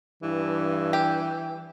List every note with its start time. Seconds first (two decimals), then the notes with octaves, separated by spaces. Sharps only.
0.23 G2 E3
0.93 G4